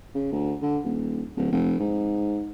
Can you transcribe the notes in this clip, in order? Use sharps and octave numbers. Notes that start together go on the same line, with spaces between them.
C#3
D2
D3
D#1
D1
F1
G#2